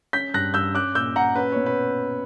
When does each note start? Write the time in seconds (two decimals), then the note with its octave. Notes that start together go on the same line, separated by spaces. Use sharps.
0.13 C#4 G6 B6
0.34 G2 F#6 A#6
0.54 G2 E6 G6
0.74 C#4 D6 F#6
0.95 A#2 E6 G6
1.15 A#2 F#5 A#5
1.36 C#4 B4
1.52 B2 C#5
1.66 B4